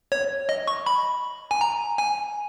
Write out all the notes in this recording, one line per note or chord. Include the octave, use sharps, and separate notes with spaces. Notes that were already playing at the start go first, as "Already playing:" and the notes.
C#5
D#5
C#6
B5
G#5
A#5
G#5